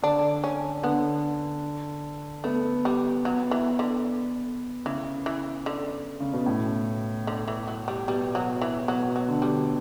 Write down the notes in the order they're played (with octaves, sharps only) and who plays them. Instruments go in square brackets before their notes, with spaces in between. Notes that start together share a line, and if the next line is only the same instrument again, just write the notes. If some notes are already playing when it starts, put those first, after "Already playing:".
[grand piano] D3 [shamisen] D4
[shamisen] C#4
[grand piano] D3 [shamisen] B3
[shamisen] A3 [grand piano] B3
[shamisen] G3
[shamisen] F#3 [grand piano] B3
[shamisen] E3
D3
[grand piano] C#3 [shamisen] E3
[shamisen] E3
D3
[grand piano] C#3
B2
A2
[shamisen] D3
E3
F#3
G3
[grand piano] B2 [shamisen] G3
[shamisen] F#3
E3
[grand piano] B2 [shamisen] F#3
[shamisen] F#3
[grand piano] D3
[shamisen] G3